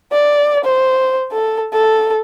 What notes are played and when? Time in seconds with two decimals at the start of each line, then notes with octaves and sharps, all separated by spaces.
0.13 D5
0.65 C5
1.33 A4
1.73 A4